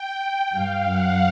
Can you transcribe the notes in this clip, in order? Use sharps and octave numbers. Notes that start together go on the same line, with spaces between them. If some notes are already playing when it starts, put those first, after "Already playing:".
Already playing: G5
G2 F5
F#2 F#5